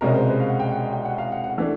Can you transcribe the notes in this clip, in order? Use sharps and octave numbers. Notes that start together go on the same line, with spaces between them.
C2 B2 G#3 C#4 A#4
C5
B4
F5
F#5
G5
F#5
G5
F#5
F5
F#5
F#5
E3 A3 D4